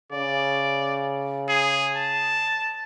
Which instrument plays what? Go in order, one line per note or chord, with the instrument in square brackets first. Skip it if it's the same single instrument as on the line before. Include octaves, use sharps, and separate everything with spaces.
[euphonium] C#3 [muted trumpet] D5
[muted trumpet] G#4
A5